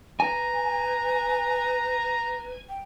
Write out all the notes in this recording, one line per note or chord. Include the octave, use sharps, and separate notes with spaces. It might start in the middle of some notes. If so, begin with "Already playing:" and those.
B4 G#5 A#5
G5